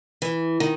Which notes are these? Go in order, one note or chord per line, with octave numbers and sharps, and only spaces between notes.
E3
D#3